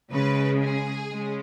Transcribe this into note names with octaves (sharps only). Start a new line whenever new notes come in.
C#3 G#3 B4
G#4
C#3 G#3